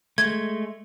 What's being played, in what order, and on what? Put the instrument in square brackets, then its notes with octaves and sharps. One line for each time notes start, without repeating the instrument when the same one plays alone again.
[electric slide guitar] G#3 A3 [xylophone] G#6